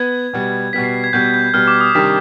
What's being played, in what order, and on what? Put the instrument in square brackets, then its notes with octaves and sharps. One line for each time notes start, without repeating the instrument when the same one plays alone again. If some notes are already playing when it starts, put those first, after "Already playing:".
Already playing: [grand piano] B3 B4 [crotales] G#6
[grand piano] B2 G3 B3
[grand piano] B2 G3 B3 [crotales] B6
[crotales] C7
C7
G#6
[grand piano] B2 G3 B3 [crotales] G6
[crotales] G6
[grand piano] B2 G3 B3 [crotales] F6
[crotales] D6
D#6
[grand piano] C3 D#3 G3 D4 G4 [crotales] B6